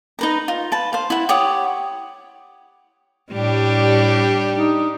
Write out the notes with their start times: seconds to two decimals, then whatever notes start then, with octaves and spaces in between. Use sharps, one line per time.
0.19 D#4 B4 A#5
0.48 F4
0.72 B4 A5
0.93 C5 F5
1.10 E4 F#5
1.29 G4 C#5 F#5 D#6
3.32 A2 G3 D4 G4
4.55 D#4